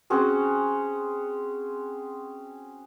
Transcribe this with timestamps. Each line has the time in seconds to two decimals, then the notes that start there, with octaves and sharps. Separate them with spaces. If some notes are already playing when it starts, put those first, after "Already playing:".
0.10 C4 C#4 F#4 G#4